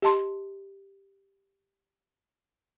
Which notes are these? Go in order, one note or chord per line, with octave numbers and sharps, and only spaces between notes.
G4 D#5 A5 C6